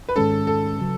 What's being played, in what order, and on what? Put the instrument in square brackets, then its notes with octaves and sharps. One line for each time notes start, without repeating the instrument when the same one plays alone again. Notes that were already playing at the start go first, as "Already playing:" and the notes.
[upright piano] B4
[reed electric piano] G#2 D#3 G#3 C#4 [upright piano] A4
[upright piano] A4
[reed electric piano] C#3 F#3